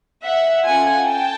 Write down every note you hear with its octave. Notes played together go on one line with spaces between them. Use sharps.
E5 F#5
C#4 F4 A4 F#5 G#5
G5 A5